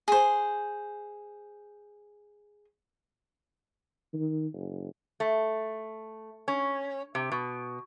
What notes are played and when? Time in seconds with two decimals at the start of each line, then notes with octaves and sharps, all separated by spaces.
0.08 G#4 C5
4.13 D#3
4.54 F#1
5.20 A3
6.48 C#4
7.15 C3
7.32 B2